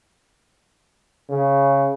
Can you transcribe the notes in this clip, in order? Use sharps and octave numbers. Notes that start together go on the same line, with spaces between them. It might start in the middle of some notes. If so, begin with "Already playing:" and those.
C#3